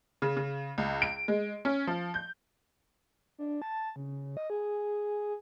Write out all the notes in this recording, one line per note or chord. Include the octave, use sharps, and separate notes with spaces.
C#3
C#3
C#2
D7
G#3
C#4
F3
G6
D4
A5
C#3
D#5
G#4